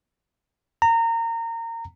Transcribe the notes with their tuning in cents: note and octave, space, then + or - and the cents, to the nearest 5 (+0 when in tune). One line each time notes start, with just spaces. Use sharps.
A#5 -25